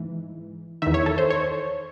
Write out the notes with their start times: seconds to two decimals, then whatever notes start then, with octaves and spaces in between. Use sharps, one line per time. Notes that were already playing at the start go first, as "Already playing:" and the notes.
Already playing: G#2 E3
0.82 E2 D#3 E5
0.94 C#5
1.06 A4
1.18 C5
1.30 C#5